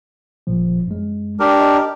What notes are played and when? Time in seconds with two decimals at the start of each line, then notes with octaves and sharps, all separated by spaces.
0.47 G1 A#2 F3
0.87 F#2 G#3
1.40 D4 G4 A#4
1.60 D#5